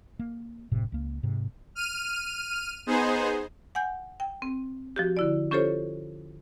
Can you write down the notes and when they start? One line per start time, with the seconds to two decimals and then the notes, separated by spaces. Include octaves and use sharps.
0.19 A#3
0.71 F#1 A2 C3
0.92 C#2 A#3
1.23 G#2 C3
1.75 F6 D#7
2.86 B3 D#4 G#4 C5
3.75 F#5 G#5 G6
4.20 G5
4.42 C4
4.96 F3 F#4 G4
5.17 D3 E4 D5
5.51 C#4 F4 G4 A4 C5 C#5